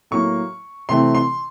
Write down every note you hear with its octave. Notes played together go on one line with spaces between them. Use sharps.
A2 F#3 A#3 C#6
C3 E3 A3 C4 C6
C6